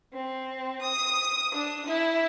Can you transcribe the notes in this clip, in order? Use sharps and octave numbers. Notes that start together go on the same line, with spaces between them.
C4
D#6
D4
E4